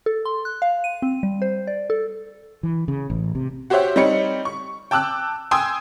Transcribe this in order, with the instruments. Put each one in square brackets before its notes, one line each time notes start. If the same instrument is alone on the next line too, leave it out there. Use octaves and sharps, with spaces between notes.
[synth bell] A4
C6
F#6
F5
D#7
C4
G3
C5
D5
A4
[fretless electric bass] E3
C#3
A1
C3
[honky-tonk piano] F#4 G4 C5 C#5 E5 F#5
G3 C4 D#4 C#5 C#7
C#6
G5 A5 D6 E6 F#6
G5 G#5 C6 D#6 E6 G#6